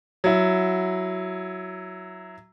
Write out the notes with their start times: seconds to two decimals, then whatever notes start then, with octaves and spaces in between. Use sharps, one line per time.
0.24 F#3 E4